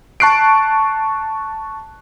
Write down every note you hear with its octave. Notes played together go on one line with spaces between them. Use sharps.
A5 C#6 F#6 C7 D7